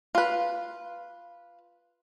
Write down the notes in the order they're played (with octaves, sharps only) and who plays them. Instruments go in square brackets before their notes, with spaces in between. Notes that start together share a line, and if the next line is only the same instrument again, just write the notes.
[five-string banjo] F4 B4